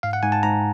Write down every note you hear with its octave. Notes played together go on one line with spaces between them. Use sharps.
G#2 F5
F#5
G#2 G#5
A5
G#2 A#5